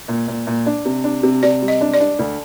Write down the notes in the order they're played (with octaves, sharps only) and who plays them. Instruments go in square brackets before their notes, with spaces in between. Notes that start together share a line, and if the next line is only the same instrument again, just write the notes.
[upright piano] A#2
A#2
A#2
D4
C3
D4
C3
[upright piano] C3 [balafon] D5
[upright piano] G3
[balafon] D#5
[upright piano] D4
[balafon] D5
[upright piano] D4
D2